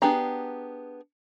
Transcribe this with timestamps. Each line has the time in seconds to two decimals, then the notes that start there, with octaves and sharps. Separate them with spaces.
0.02 B3 D4 G4 G#4 A#5